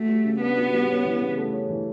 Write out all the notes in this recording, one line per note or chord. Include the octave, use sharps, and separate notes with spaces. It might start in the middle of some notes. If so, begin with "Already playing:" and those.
Already playing: A3 F#4
G3
C#3
B3 D4
F#4
G3
C#4
E3
C#3
A3
C#4
E3